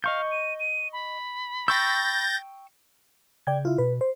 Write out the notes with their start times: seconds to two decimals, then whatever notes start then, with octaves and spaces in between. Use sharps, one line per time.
0.04 D#5 F5 C#6 G6
0.31 D#7
0.60 D#7
0.93 B5
1.68 G5 C#6 E6 G6 A6 A#6
3.47 C#3 D5 G5 G#6
3.65 E4 F4
3.78 B2 B4
4.01 C5